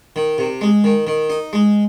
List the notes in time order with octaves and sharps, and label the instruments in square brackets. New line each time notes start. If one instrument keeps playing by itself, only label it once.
[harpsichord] D#3
C3
G#3
D#3
D#3
D#4
G#3